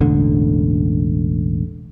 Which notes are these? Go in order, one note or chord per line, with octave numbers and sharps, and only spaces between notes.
E1 A1 D3